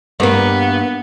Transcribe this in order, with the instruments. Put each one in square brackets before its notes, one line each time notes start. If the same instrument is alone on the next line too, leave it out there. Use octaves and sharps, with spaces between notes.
[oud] G2 A#3 [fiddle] B3